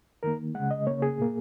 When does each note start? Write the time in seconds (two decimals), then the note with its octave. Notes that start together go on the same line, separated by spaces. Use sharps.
0.23 D#3 A#3 A#4
0.54 C#3 G#3 F#5
0.71 D#5
0.87 C#3 A#3 C#5
1.02 G#4
1.18 A#2 A#3